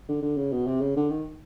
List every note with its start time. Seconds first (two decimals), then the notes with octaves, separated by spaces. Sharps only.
0.09 D3
0.22 D3
0.37 C#3
0.52 B2
0.67 C3
0.81 C#3
0.96 D3
1.10 D#3